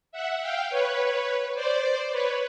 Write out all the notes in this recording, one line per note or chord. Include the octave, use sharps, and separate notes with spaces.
E5 F#5
F5 G5
B4 C#5
C5 D5
B4 C#5